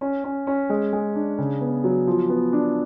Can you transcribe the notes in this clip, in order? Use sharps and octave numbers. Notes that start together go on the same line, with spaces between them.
C#4
C#4
C#4
G#3
G#3
D4
C#3
B3
F#3
F3
B3
D4